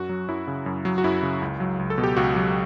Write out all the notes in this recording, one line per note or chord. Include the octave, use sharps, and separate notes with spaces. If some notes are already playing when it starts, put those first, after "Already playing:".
Already playing: F#2 F#4
F#3
F#2 E4
C#3
F#2
F#3
F#4
F#2 E4
C#3
C#2
F#3
C#2
A4
B2
G4
C#2 F#4
F#3